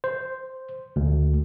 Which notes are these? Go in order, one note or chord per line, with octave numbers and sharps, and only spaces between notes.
C5
D2